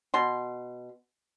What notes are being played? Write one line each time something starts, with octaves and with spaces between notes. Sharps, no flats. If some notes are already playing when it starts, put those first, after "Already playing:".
B2 C6